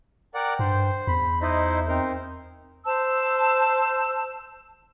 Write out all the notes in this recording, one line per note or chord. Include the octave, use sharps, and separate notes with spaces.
A#4 D5 F#5 G5
G2 C5
E2 B5
D#4 E4 C5 D#5
C4 D#4 A#4 C5
C5 A5 E6